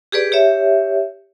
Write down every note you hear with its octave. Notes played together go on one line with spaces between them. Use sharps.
G4 G#4 B4 D5
G4 C#5 E5